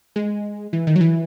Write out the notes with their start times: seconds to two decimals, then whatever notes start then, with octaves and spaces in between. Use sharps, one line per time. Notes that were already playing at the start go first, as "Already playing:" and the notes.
0.16 G#3
0.73 E3
0.87 D#3
0.96 F#3
1.01 E3